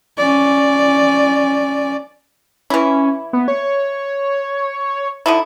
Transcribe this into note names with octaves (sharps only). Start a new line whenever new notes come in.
C#4 D5
E3 C#4 E4
B3
C#5
D3 D#4 E4